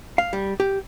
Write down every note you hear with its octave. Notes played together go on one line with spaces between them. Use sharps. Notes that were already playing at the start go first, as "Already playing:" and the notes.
F5
G3
G4